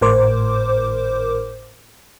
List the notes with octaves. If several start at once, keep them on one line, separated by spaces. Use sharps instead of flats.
G#1 A2 A#4 C5 D6